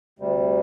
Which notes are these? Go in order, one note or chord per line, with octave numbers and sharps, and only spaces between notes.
D2 C3 G3